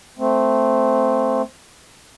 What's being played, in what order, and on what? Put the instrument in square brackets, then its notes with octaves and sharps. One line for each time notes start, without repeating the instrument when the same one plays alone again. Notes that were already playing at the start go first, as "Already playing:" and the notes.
[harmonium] A3 C4